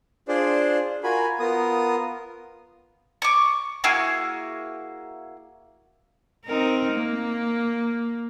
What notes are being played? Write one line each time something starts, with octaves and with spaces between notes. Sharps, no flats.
D4 F4 G#4 C5 D5
F4 F#4 A#4 G#5 B5
B3 F4 A#4 D#6
C#6 D6
A#3 E4 F#4 G#4
C4 D#4 A#4
A#3